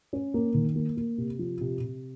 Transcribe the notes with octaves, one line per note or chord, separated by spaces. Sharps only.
C#4
A#3
D#3
A#3
A#3
C3
F3
C3
C3